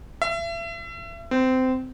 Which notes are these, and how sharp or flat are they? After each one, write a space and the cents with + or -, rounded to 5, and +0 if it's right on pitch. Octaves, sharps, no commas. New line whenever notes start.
E5 +35
C4 -20